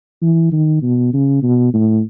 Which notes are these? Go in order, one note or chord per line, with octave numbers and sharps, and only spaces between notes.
E3
D#3
B2
C#3
B2
A2